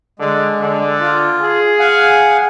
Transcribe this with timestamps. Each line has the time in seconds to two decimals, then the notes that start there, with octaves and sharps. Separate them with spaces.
0.19 D3 G#3
0.61 D3
1.00 F4
1.41 G#4
1.79 F5 F#5 G#5